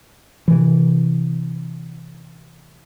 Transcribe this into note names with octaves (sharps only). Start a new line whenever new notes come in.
C3 E3